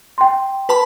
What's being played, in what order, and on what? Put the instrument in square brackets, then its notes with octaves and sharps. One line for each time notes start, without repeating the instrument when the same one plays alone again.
[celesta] G5 C6
[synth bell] B4 A5 B5